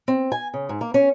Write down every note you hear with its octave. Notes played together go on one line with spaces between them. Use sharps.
C4
G#5
C#3
G#2
A#3
C#4